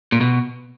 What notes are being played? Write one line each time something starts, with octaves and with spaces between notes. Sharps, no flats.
A#2
B2